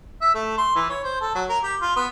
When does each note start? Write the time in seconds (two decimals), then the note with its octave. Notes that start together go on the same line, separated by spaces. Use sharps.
0.21 E5
0.34 A3
0.58 C6
0.75 E3
0.89 C#5
1.03 C5
1.21 A4
1.35 F#3
1.49 A#4
1.63 G4
1.81 F4
1.96 B3